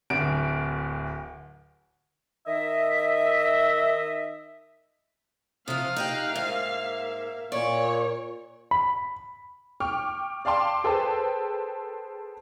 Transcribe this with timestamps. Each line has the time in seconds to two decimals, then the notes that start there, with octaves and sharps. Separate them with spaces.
0.10 D1 D2 D7
2.46 D#3 D#5 E5
5.68 C3 F3 F5 D#6 F6
5.96 D#4 G4 G5 A#5 F#6
6.36 G#2 A#3 E5
7.52 A#2 C#5 D5
8.71 B5
9.80 G5 C#6 D6 F6
10.45 D5 F5 G5 A5 C6 D6
10.84 G#4 A4 B4 C5 G5 A5